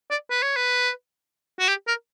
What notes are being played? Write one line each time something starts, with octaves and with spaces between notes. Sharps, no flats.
D5
B4
C#5
B4
F#4
G4
A#4